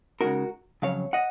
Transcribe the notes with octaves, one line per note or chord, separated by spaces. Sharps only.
C#3 G#3 D#4 F#4 A#4
F2 C#3 F#3 C#5 F5
D#5 F#5